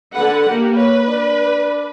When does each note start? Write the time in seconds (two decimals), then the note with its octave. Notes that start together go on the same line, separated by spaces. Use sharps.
0.13 D3 B4 F#5
0.47 A#3 G4
0.77 B4 C#5
1.08 D4